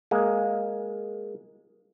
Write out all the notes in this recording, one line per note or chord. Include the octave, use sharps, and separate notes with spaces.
G#3 A#3